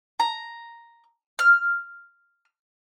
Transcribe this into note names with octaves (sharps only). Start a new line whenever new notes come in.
A#5
F6